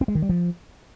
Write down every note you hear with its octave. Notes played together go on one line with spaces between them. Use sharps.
C4
G#3
D#3
G3
F3